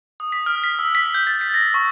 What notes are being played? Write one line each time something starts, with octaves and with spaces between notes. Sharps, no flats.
D#6
B6
F6
B6
E6
B6
G6
A6
B6
A#6
C#6